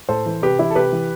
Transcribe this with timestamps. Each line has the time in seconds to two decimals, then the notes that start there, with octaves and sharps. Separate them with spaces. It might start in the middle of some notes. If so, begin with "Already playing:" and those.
0.09 A2 A4 C5
0.26 E3
0.42 C3 G4 B4
0.59 E3 E4 G4
0.71 A4
0.75 C3 G4 B4
0.92 E3